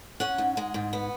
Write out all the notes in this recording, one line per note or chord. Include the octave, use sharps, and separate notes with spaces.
C#4 F#5
G#2
G#3
G#2
B3